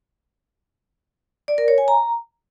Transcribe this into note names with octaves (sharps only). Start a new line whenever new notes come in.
D5
A#4
C#5
G#5
A#5